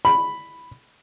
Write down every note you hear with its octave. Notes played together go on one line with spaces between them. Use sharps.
B5